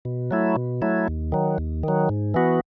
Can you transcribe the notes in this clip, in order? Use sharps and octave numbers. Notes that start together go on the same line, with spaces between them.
B2
F#3 A3 E4
B2
F#3 A3 E4
D#2
D#3 F#3
D#2
D#3 F#3
G#2
E3 B3 F#4